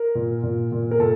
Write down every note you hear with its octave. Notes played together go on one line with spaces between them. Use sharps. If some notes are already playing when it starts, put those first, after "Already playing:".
Already playing: A#4
A#2
A#2
A#2
A#4
A#2 A4